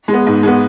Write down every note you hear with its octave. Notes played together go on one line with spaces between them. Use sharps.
G#3
B3
G#2
G#3 B3